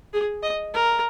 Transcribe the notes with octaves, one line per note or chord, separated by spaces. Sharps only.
G#4
D#5
A#4